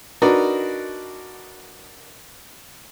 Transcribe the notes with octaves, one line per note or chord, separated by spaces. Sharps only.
D4 D#4 F#4 A#4 B4